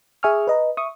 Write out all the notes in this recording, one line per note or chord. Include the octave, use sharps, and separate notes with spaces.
G#4 E5 G#5 C#6 D#6 F6
B4 D#5 A#5
E5 C#6 D#6